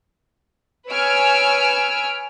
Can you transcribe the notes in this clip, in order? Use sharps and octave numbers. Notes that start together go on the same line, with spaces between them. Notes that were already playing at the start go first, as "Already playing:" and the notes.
B4 C#5 G#5 E6 F6 D7